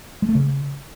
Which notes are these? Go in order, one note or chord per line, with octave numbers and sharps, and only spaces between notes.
G#3
A3
C#3